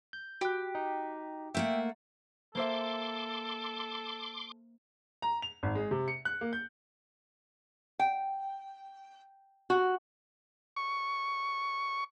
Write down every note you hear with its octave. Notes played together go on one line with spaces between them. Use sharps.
G6
F#4 G4 F#6
D#4
A3 A#3 E5 F#5 G5
A#3 A4 C5 E5 C6 D6
A#5
F7
G#1
G#3
C3
C#7
F#6
A#3
G6
G5
F#4
C#6